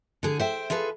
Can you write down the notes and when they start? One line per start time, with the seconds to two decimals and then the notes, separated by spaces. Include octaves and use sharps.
0.23 D3 G#4
0.39 C5 E5 G5
0.70 F4 G#4 A4 B4